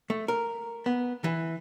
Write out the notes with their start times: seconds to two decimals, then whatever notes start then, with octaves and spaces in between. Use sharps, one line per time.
0.10 A3
0.28 A#4
0.86 B3
1.24 E3